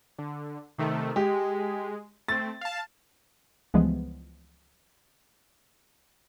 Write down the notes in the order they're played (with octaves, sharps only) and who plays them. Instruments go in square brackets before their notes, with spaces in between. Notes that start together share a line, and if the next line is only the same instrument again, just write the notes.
[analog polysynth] D3
C3 D#3 A3
[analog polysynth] G#3 [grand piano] G4
[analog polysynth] A3 C4 [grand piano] A6
[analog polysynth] F5 A5
[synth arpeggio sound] C#2 E3 F3 G3 G#3 B3